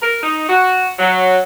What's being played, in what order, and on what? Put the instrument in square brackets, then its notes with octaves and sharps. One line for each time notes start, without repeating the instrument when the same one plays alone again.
[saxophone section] A#4
D#4
F#4
F#3